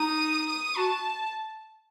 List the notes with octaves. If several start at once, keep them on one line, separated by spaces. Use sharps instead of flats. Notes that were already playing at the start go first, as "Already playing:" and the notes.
Already playing: D#4 D#6
D#6
F#4 A5